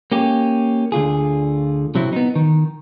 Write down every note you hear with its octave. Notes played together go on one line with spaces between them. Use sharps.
A#3 C#4 G4
D2 D3 F4 G#4
C3 F#3 C4 E4
B3 D#4
D#3